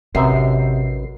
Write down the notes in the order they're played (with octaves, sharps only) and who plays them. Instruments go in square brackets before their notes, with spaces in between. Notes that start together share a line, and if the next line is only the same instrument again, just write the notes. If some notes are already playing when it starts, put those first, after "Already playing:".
[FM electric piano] A1 B4 C7 [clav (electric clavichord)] F#2 D#4 E5 [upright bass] C3